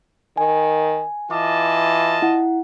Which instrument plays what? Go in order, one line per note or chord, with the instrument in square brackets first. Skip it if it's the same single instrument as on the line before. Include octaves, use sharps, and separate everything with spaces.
[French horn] D#3 [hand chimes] G#5
[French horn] E3 [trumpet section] F4 D#5 A5 [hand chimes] D6
[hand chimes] E4 F#5